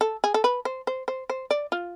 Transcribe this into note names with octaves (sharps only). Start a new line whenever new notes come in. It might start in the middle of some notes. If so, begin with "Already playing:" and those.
A4
G#4
A4
B4
C5
C5
C5
C5
D5
F4